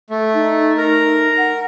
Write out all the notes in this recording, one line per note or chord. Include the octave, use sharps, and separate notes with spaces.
A3
D#4
A#4
F#5